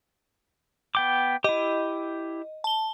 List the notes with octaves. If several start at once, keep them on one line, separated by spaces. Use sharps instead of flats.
B3 G5 D6
E4 G4 D#5
A5 G7